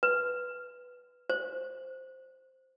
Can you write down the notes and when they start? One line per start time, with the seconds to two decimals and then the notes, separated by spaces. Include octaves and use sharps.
0.03 B4
1.30 C5